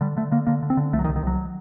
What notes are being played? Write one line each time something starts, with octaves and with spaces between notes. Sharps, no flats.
D3 G3
D3 A3
D3 A#3
D3 A#3
D3
C4
D3
C2 A3
F#3
D#3
C2
D#3
C2 F#3